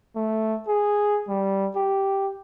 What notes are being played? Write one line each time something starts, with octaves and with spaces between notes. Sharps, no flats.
A3
G#4
G3
G4